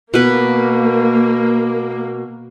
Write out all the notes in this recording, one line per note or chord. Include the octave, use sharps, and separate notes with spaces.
B2 A#3 B4